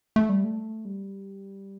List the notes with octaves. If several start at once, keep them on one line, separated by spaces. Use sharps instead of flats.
A3
G3
A3
G3